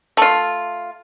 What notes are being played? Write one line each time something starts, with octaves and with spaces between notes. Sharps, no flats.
A3 F4